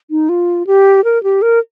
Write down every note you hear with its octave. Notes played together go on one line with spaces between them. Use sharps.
D#4
F4
G4
A#4
G4
A#4